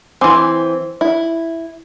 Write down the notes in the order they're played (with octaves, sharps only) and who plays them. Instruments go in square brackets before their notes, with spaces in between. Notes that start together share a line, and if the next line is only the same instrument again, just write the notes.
[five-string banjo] E3 C4 [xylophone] G#5 C6 D6
[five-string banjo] E4